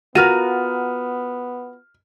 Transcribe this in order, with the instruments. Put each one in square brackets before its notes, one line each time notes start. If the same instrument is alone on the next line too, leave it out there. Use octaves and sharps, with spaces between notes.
[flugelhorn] B3 [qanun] F4 A#4 B4 [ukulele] F#4 [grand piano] F6 D#7